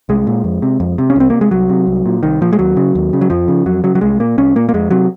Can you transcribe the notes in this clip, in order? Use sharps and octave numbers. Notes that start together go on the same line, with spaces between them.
C2 G#3
A#2
F2
C3
F2
C3
C#4
C2 C4
C3 A#3
G#3
C2 F#3
C3
C2
A#2
C2 D#3
A#2 F3
G#3
D#2 F#3
C#3
D#2
C#3
F#3
F2 F3
C#3
F2 F#3
C#3 F#3
F#3
C2 G#3
A#2 A#3
C2 C#4
A#2 A#3
A#3
F2 G#3
C3 F#3